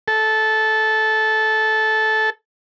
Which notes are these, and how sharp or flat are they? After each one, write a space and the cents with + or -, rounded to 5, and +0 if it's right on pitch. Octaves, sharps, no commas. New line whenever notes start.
A4 -15